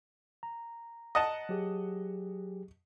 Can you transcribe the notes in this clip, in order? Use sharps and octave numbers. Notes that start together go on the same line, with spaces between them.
A#5
D#5 F#5 A5
F#3 G4 G#4